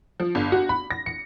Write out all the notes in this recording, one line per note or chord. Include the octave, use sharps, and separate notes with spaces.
F3
G1
F#4
B5
A#6
C#7